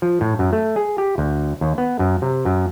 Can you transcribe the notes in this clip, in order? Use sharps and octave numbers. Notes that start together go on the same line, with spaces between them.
F3
A2
F#2
A3
G#4
G4
D2
D#2
B3
F#2
C3
F#2